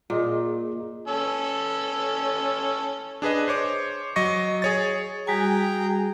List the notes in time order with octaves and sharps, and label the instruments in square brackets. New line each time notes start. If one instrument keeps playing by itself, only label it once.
[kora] A#2 [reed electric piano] F4 G#4 D#5
[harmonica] C#4 A4 E6
[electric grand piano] D4 G#4 B4 D#5
C5 C#5 D6
F#3 D#5 C#6 A#6
G#4 C#5 A6
[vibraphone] G3 F#4 G#5 [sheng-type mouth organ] G#4 G5 A#5